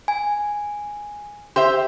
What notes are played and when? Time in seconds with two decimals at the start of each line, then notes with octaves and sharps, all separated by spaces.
0.08 G#5
1.56 G4 C5 E5 C6